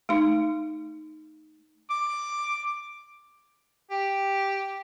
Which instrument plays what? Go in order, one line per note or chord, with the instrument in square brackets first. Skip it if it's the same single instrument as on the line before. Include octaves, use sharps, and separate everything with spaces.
[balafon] A3 D#4
[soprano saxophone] D6
G4